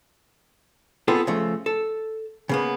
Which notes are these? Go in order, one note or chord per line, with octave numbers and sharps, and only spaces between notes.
B3 C4 F4 G#4 A4
C#3 F3 A3
A4
C#3 A#3 B3